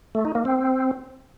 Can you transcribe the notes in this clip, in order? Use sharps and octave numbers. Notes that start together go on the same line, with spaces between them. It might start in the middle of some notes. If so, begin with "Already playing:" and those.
A3
D#4
A#3
C4